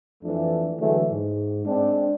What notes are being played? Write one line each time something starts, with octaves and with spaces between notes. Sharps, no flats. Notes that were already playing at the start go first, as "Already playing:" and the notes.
F2 E3 F3 A3 D4
D3 E3 F#3 G#3 A3
G#2
G#3 C4 D4